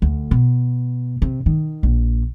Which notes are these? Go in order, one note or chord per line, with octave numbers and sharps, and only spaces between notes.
D2
B2
C3
D#3
A#1